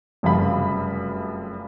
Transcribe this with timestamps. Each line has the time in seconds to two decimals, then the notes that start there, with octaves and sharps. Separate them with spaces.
0.23 F1 F#2 C#3 G3 F5 B5